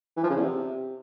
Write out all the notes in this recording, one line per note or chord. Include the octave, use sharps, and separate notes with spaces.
E3
F3
C#3
E2
C3